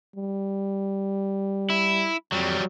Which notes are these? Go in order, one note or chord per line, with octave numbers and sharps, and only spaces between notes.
G3
E4
F2 F#3 G3